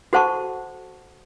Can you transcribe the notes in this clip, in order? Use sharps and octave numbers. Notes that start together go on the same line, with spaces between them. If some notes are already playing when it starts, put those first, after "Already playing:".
F#4 A4 C5 F#5 A5 C#6